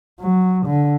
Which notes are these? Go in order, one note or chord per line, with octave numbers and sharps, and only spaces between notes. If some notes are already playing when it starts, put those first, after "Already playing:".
F#3
D3